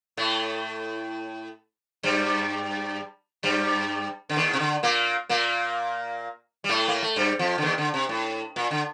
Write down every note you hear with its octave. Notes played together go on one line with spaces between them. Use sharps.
A2 A3
G2 G3
G2 G3
D3
D#2 D#3
C3
D3
A#2 A#3
A#2 A#3
G3
A2 A3
A#3
A3
G2 G3
F2 F3
D3
D#2 D#3
D3
C3
A2
A#2
D3